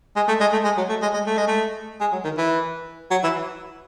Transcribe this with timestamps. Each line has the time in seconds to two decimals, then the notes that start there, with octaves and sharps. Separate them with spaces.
0.16 G#3
0.28 A3
0.41 G#3
0.53 A3
0.64 G#3
0.77 F#3
0.89 A3
1.02 G#3
1.14 G#3
1.26 A3
1.38 G#3
1.48 A3
2.01 G#3
2.12 F#3
2.24 D#3
2.38 E3
3.11 F#3
3.24 E3